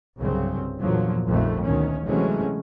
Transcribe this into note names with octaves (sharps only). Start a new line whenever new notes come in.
C2 G2 C#3 F#3 C4
E2 A#2 D3 F3 F#3 A#3
A#1 F2 A#2 D#3 G3 A3
D2 B2 D#3 C#4
C3 E3 F#3 G#3 A3 C#4